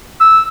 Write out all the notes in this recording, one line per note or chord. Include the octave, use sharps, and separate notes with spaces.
E6